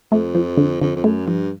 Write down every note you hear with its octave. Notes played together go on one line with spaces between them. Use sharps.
F2 A3
F3
D3
F2 D3
F2
F#2 A3
G2 F3